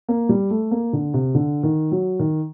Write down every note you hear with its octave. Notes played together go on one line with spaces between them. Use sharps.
A#3
G3
A3
A#3
D3
C3
D3
D#3
F#3
D#3